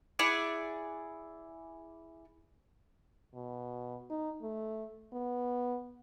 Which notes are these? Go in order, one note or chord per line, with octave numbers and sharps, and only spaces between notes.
E4 G#4 D5 F#5
B2
D#4
A3
B3